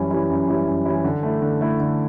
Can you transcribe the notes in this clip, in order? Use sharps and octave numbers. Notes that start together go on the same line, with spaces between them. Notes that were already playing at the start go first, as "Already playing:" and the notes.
Already playing: F#2 E3 G3 C#4 E4
E3 G3 C#4 E4
F#2
E3 G3 C#4 E4
F#2
E3 G3 C#4 E4
D3
A3 E4
D3
A3 E4
D3